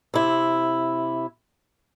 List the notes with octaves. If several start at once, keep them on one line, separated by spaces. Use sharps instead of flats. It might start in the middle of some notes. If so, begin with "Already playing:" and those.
C3 E4